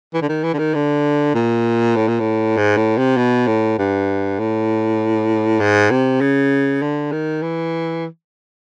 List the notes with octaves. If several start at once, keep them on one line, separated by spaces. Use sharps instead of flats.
E3
D3
D#3
E3
D3
D#3
D3
A#2
A2
A#2
A2
G#2
A2
C3
B2
A2
G2
A2
G#2
C3
C#3
D3
D#3
E3